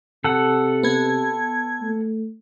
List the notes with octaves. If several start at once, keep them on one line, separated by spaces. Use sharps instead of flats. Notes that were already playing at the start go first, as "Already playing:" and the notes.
C3 A4 F#5
B3 G#6
A3